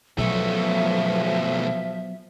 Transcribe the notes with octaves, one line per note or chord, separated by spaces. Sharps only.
B1 B2 F3 F#3 A3 E5